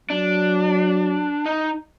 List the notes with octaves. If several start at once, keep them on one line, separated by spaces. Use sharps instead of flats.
F#3 D4
D#4